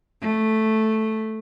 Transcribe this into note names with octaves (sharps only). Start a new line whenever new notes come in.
A3